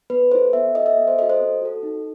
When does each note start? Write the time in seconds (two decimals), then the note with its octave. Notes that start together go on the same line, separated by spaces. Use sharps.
0.10 B3 B4
0.32 E4 A4 C5
0.53 B3 E5
0.75 F#4 A4 D#5
0.86 E5
0.97 B3
1.08 C5
1.18 F#4 A4 D#5
1.30 C5
1.40 C4
1.62 F#4 A4
1.83 D#4